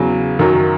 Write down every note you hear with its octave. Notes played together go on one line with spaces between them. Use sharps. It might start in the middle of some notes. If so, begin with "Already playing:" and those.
Already playing: E2 C#3 F#3
F#2 D#3 F#3